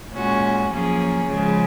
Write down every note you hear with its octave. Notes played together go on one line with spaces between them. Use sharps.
A#2 G#3 C#4 F#4
F#2 F3 A#3 C#4 G#4
C#3 F3 G#3